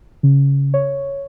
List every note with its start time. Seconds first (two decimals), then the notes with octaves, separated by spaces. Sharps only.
0.23 C#3
0.74 C#5